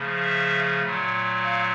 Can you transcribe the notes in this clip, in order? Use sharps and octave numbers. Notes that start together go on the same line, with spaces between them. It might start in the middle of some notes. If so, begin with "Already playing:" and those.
Already playing: C#3 F3 A3
E5
A#2 F#3 A3
F5